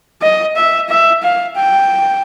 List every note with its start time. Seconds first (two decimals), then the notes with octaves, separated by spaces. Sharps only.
0.22 D#5
0.56 E5
0.89 E5
1.23 F5
1.56 G5